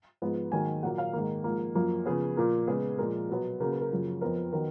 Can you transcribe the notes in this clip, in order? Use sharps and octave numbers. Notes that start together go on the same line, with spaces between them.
G#2 F3 B3
G#2 D#3 F#3 A#3 G#5
A#2 F#3 A#3 F#5
F5
G#2 D#3 A#3
G#2 F3 A#3
F#2 F3 A#3
C#3 F3 B3 G#4
A#2 F3 A#3
C#3 G#3 B3 G#4
A#2 F3 G#3 A#4
B2 F#3 B3
C#3 F#3 A#3 A#4
B4
A#4
F#2 C#3 F3 A#3
F2 F3 B3 A#4
D#3 F#3 B3 A#4